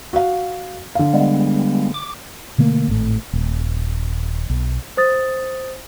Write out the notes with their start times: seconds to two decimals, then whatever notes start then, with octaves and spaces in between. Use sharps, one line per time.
0.13 F#4 F5
0.95 D3 F5
1.14 G3 G#3 B3
1.94 D6
2.58 B2 D3 A3 A#3
2.88 G#1 A2
3.33 D#1
4.50 B1
4.97 C5 D#6 A6